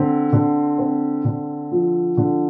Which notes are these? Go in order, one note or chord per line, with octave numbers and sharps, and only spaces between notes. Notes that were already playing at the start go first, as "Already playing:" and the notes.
Already playing: D3 C4
D3
C4
D3
F3
D3